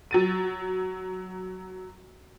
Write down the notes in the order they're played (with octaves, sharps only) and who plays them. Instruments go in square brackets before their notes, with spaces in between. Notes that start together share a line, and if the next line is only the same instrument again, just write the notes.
[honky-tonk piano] F#3 A6 D#7